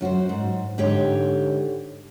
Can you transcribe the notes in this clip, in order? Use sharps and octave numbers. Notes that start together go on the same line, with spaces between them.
F#2 F#4 G4 C5
G#2
G#2 D3 G4 C#5 G5